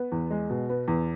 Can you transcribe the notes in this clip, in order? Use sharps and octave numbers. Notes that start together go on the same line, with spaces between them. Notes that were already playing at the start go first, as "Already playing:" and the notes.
Already playing: B3
E2
G#3
B2
B3
E2